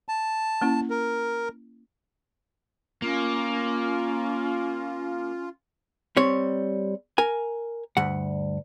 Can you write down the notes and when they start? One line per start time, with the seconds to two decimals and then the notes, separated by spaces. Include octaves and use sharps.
0.09 A5
0.61 A#3 C#4 E4
0.90 A#4
3.02 A#3 C#4 F4
6.17 G3 C4 C#5
7.18 A#4 G#5
7.97 D2 G2 F#5